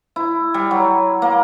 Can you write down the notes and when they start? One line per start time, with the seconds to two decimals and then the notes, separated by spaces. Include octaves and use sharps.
0.16 E4
0.54 G3
0.71 F#3
1.22 A#3